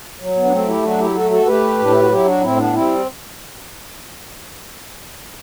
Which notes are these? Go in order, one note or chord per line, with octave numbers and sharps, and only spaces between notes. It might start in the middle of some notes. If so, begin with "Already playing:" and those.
F#3
B3
D4
A3 C4
E4 G4
F#3 D4 F#4
E4 G4
A3 F#4 A4
F#4 A4
A3 G4 B4
A2 D4
E4
F#4
F#3 E4 G4
D4 F#4
A2 C4 E4
B3 D4
G3 C4 E4